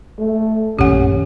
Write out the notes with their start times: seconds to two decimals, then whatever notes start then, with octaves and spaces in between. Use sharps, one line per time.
0.19 A3
0.79 A#1 F#2 D#3 C#4 G4 F#5